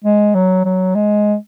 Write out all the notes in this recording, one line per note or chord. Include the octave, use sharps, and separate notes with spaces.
G#3
F#3
F#3
G#3